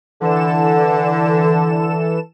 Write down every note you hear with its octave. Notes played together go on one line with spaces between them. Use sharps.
D3 E3 A4 E7